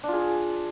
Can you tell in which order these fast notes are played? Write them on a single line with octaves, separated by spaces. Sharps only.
D4 F4 G#4